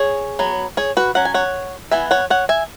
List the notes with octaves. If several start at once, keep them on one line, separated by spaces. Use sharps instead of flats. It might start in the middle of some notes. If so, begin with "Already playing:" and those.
Already playing: G#4 C#5
F#3 B3
G#4 C#5
F#4 B4
F#3 C#4 F#5
G#5
C#5 F#5
E3 B3 E5 G#5
C#5 F#5
C#5 F#5
E5 G#5